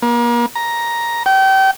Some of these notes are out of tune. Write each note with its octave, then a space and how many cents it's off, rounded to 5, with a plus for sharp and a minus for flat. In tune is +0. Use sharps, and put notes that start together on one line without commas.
A#3 +35
A#5 +5
G5 -30